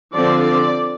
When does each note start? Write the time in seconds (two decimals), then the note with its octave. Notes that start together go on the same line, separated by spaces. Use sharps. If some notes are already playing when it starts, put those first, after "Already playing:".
0.14 D3 F3 C4 D5
0.44 D5